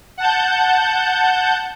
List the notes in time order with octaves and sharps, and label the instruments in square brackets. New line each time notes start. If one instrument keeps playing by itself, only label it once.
[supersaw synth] F#5 A5 G6